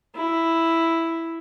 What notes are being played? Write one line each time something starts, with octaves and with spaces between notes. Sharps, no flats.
E4